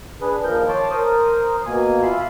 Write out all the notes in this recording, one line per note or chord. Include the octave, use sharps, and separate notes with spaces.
D4 G#4 B4
D#2 F3 A#4 G6
C#5 A5 C6 D6
A#4 C5 D#6
B2 A#3 G#5
F4 E5 B5 C6